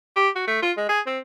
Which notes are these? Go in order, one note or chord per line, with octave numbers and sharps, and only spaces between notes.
G4
F#4
A3
F4
G#3
G#4
C4